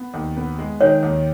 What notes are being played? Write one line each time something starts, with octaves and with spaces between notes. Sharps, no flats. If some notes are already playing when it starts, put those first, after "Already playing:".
Already playing: B3
D#2
B3
G#3
D#3 C#5
D#2